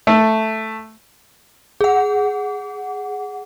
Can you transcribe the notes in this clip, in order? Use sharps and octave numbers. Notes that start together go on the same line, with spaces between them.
A3
G#4 F#5